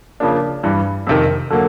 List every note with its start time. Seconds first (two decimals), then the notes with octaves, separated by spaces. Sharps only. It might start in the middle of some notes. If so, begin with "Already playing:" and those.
0.20 C#3 F3 A#3 D4
0.63 G2 E3 G3
1.07 F2 C3 D#3
1.50 D3 F#3 A#3